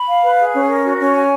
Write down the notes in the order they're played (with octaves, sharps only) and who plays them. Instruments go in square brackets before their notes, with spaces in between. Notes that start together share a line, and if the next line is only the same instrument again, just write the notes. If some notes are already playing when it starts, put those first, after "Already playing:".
Already playing: [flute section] B5
F5
B4
G#4
C#4
A#4
F#4
C#4
G#5